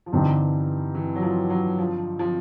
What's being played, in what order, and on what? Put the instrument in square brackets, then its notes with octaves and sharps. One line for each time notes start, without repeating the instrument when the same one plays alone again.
[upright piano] F3
[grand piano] G2 D3 G3 C4 D#4 [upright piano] E3
[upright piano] E3
F#3
F3
F#3
F3
F3